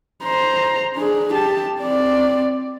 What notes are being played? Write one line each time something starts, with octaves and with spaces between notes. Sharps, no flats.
C5 A#5
D4 G#4
G4 A5
C4 D5